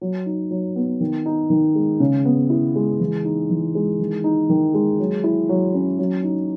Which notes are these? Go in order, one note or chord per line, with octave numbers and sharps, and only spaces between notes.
F#3
D#4
F#3
B3
D#3
D#4
D#3
G#3
C#3
B3
E4
G#3
E3
D#4
E3
G#3
D#3
D#4
D#3
G#3
F#3
E4
F#3
C#4
F#3
D#4